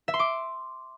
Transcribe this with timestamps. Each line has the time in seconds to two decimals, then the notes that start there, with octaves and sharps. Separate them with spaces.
0.08 E5
0.14 C6
0.19 D6